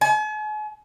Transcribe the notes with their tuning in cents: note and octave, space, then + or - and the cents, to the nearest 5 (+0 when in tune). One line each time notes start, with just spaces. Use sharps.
G#5 +45